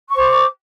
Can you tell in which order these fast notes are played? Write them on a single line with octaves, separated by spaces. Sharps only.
C#6 C5 D6